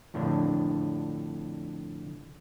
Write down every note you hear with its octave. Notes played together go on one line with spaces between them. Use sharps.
F2 A2 D3 D4